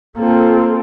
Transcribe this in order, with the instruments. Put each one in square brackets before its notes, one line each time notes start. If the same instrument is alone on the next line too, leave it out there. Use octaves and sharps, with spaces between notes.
[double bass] A#3 [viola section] C4 F4 A4